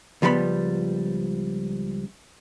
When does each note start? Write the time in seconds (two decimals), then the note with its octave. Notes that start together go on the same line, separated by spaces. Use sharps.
0.22 C#2 F3 G3 B3 B5